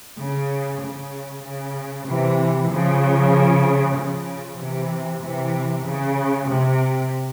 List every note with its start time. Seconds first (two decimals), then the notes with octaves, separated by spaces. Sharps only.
0.18 C#3
0.81 C#3
1.44 C#3
2.07 C3 E3
2.70 C#3 F3
3.96 C#3 F3
4.59 C3 E3
5.22 C3 E3
5.85 C#3
6.49 C3